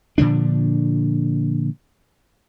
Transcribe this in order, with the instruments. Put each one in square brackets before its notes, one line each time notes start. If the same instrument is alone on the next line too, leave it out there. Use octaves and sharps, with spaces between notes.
[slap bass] A#2 D3 F3 D4